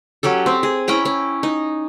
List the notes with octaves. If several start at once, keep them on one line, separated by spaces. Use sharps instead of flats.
F#3 C#4 G4 A4
C4
G#4
C#4 E4 G5 A#5
C#4
D#4